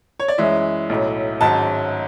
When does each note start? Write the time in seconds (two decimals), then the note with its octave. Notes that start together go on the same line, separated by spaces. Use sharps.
0.20 C#5
0.28 D5
0.38 F#2 E3 G#3 C#4 E5
0.89 B1 A2 F#3
1.41 G#1 G#2 F#3 C#4 A5